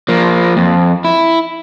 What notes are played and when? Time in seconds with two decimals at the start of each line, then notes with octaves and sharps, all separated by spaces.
0.08 F3 A#3
0.57 F2
1.05 E4